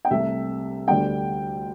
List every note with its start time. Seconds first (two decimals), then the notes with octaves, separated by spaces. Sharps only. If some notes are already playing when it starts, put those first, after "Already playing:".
0.05 G5
0.11 C2 C3 A3 E5
0.88 D2 D3 G3 G5